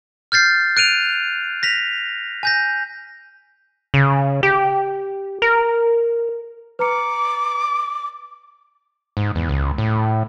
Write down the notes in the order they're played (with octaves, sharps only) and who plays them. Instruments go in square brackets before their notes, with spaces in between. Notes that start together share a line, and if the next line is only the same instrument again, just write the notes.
[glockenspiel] F6 G6 A6 C7
F#6 D7 D#7 F7
A#6 B6 F7
G#5 G6 A#6
[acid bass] C#3
G4
A#4
[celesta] B4 A#5 C#7 [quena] D6
[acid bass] G#2
E2
C#2
A2